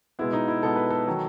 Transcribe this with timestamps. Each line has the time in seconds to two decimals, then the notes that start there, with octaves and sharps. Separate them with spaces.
0.19 B2 G#3 B3 E4
0.33 D#4
0.48 E4
0.63 B2 G#3 B3 A4
0.76 B4
0.91 A4
1.07 D#3 F#3